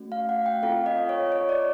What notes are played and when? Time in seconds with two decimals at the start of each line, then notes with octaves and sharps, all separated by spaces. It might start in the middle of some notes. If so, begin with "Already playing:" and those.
Already playing: A3 C#4 F#4
0.12 F5
0.29 F#5
0.46 G5
0.63 C4 F4 A4 F5
0.86 D#5
1.09 C#5
1.32 C#5
1.49 D5